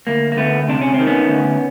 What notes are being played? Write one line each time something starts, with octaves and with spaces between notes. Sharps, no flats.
D2 A#3
A#3
D2 A3 B3
C3 D4
C#4
C4
D#3
B3 C#4
D2